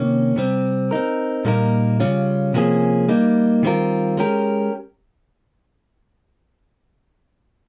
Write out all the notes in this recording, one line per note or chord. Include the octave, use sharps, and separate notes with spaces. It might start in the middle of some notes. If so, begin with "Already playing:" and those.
Already playing: C3 D#3 A#3 C#4
C3 G3 C4
C4 D#4 A#4
A#2 G3 A#3 D#4 A#4
C#3 G3 C#4 F4
C3 F3 A#3 C#4 G#4
G3 A#3 D#4
D#3 G3 C4 F4 A#4
G#3 C#4 G4 A#4